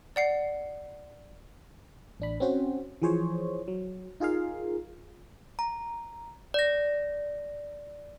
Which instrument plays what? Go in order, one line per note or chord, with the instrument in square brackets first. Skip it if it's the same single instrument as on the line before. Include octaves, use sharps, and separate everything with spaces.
[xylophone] D5 F#5 C7
[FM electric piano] A1 D4 B5
C4 C#4 F#4 C5
E3 F3 G#4 C5 C#5
F#3
D#4 F4 G#4 A#4 F5
[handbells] A#5
D5 A#6